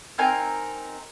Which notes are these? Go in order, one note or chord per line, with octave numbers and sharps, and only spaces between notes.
C4 D#4 A#4 G#5